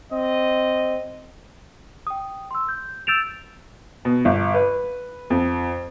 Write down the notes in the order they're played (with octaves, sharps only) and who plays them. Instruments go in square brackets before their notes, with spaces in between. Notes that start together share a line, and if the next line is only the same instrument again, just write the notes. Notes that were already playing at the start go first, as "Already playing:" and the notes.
[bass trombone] C4 [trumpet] D#5
[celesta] G5 D#6
C6 E6
G6
E6 G6 A6 D7 E7 F7
[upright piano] B2
G1
B4
F2